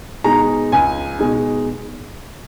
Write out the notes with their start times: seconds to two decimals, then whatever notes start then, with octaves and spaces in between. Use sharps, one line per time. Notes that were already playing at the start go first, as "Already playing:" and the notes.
0.24 B2 G#3 D#4 A#5
0.72 C#2 G#5
1.19 B2 G#3 D#4